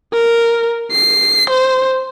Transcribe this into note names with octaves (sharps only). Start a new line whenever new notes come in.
A#4
C7
C5